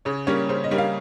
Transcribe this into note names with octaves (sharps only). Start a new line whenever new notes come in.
C#3 C#5
G3 A#3 C#4 C#5
C#3 C5
D#5
G3 A#3 C#4
F5